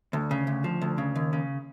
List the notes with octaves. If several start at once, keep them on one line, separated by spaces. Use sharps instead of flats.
D2
C#3
D2
F3
D2
C#3
D#2
C#3